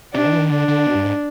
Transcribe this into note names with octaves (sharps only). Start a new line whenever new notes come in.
C3 D4
D#3
E3
D#3
D3 D4
D3
B2
G2
G#2